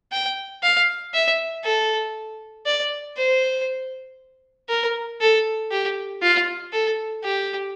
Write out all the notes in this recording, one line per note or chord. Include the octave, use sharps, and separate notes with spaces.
G5
F5
E5
A4
D5
C5
A#4
A4
G4
F4
A4
G4